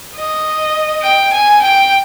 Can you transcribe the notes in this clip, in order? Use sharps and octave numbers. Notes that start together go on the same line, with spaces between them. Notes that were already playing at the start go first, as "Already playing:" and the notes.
D#5
G5
G#5
G5